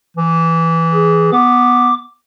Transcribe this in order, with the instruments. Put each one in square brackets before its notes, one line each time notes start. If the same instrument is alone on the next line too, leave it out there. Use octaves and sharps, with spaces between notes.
[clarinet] E3
[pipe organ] G#4
[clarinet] B3 [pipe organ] D6